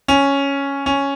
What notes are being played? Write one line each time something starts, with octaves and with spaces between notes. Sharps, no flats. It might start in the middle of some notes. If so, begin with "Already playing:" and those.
C#4
C#4